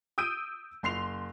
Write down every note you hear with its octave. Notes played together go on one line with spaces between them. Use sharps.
D#6 E6 G6 D7 D#7
F#1 C6 C7 F7